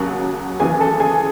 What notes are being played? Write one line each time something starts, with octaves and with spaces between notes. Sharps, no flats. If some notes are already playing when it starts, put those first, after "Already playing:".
Already playing: D#2 C#3 F#3 F#4 F#5
D#2 C#3 E3 G#4 G#5
A4 A5
G#4 G#5